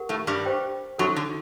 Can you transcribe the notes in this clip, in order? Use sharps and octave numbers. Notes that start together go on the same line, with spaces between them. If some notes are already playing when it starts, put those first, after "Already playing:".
Already playing: G4 A#4 F#5
A2 A3
G2 G3
G4 C5 G5
F#2 F#3 D#4 F#4 A4
D3